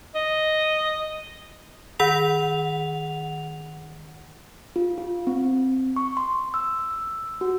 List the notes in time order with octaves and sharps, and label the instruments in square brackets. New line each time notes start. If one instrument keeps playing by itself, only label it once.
[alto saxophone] D#5
[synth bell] D#3 F#5 F7
[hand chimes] F4
F4
C4
C#6
C6
E6
F#4